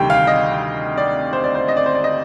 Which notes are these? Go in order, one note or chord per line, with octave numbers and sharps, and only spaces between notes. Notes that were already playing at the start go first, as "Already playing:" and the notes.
Already playing: D2 C3 D#3 G3 G5
F5
D#5
D5
C5
D5
C5
D#5
D5
C5
D5
D#5